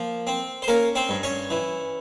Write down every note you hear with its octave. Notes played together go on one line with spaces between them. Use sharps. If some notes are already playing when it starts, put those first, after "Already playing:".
Already playing: F3 A#3
C4
C5
A#3 C#4 A#4
C4 C5
G2
C#4 C#5
E3